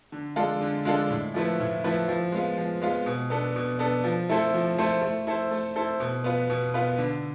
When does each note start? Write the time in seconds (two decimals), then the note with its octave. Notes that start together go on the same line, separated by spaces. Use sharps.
0.12 D3
0.36 G#3 D4 F4 A4
0.61 D3
0.85 G#3 D4 F4 A4
1.10 A2
1.34 F3 A3 E4 B4
1.60 A2
1.84 F3 A3 E4 B4
2.08 F3
2.32 G#3 B3 F4
2.58 F3
2.82 G#3 B3 F4
3.06 B2
3.30 B3 D4 A4
3.56 B2
3.79 B3 D4 A4
4.04 F3
4.29 A3 E4 A4 C5
4.54 F3
4.78 A3 E4 A4 C5
5.02 A3
5.27 E4 A4 C5
5.51 A3
5.76 E4 A4 C5
6.00 B2
6.24 B3 F4 B4
6.50 B2
6.74 B3 F4 B4
6.98 D3